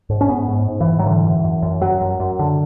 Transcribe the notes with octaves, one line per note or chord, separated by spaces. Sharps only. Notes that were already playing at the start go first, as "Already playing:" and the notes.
G#2
C#4
G#2 B3
G#2
G#2
E3
G#2
F#3
D3 E3
F#2
F#2
F#2
F#2 F#3
F#2
F#2
D3